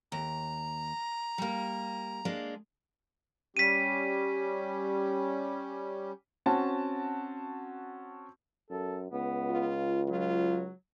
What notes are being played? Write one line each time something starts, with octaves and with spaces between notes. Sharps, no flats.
D#2 A#5
G3 A#3
G#3 A#3 D4
G3 C#4 G4 B6 D#7
C4 C#4 F#4 A5
F#2 A4
C#2 B3
F4
F#3 F4